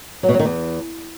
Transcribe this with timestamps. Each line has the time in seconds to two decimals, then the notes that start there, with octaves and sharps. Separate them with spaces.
0.23 F#3
0.29 B2
0.34 F#3
0.39 D#3
0.45 E2